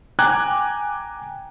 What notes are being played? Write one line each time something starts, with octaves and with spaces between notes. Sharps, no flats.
G5 G#5 A#5 D6 F#6 G#6